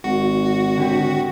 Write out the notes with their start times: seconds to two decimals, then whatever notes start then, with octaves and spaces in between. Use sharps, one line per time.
0.04 G#1 F#4
0.77 D3 G4